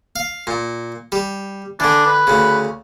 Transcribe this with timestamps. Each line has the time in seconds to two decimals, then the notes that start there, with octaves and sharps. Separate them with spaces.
0.16 F5
0.47 A#2
1.12 G3
1.80 D3 E3 D4
2.06 B4
2.27 D2 C#3